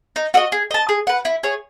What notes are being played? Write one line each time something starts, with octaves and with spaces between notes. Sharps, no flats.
D#4
F#4 A4 D#5
G#4
D#5 A5
G#4
B4 F#5
E4
G#4 C#5